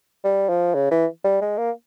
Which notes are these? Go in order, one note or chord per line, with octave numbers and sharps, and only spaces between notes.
G3
F3
C#3
E3
G3
G#3
A#3